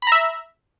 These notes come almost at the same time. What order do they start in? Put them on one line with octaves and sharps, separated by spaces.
B5 A#5 E5